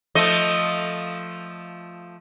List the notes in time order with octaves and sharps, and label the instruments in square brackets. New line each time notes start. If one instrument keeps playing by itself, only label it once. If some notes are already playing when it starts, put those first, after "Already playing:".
[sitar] F3 A3 D#5